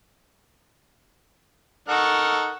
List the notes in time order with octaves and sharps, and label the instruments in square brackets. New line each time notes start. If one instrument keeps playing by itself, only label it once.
[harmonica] D#4 A4 A#4 [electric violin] F#5 C#6